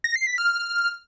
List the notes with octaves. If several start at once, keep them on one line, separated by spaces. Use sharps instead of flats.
A#6
C7
B6
F6